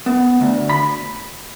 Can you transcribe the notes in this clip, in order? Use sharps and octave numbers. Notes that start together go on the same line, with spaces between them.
B3
D2
B5